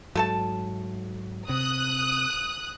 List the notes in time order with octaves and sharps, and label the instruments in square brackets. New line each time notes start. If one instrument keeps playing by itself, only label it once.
[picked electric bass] G#2 F#3 [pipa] A3 A4 A5
[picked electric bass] C3 [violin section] D#6 F#6